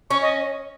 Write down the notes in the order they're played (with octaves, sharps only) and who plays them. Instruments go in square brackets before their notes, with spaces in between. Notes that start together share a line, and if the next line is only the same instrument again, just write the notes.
[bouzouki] C#4 [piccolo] C#6
[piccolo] D#5